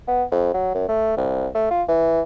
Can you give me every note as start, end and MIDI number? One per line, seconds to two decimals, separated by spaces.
0.08 0.24 59
0.32 0.53 41
0.54 0.71 54
0.75 0.88 42
0.88 1.15 57
1.17 1.47 36
1.55 1.70 57
1.71 1.83 65
1.88 2.21 52